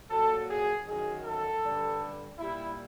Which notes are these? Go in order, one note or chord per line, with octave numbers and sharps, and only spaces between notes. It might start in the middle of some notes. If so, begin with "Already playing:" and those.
A#2 F#3 A4
G#4
F#2 D#3 F#3 G#4
A4
G2 D3 G3
A#2 G3 E4